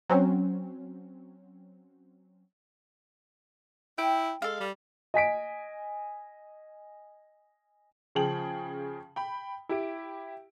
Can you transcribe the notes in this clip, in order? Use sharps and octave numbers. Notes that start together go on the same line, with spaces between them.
F#3 C4 C#4
E4 G5
G#3 A4 F5
G3
D#5 G#5 B6 D7
C#3 F3 G#4 G5 F#7
G5 B5
E4 G4 D7